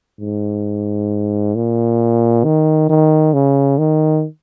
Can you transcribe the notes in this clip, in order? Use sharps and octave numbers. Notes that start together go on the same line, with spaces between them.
G#2
A#2
D#3
D#3
C#3
D#3